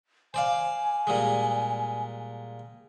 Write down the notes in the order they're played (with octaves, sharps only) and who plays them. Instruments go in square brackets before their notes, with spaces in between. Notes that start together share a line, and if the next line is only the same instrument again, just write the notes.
[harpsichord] C5 D5 F5 [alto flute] G#5
[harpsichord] A#2 G3 G#3